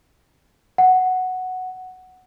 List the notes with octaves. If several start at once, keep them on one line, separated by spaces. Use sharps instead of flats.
F#5